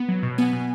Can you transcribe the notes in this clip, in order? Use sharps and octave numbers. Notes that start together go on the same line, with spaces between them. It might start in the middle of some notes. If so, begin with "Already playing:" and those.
Already playing: B3
F#3
B2
B3 G#5
B2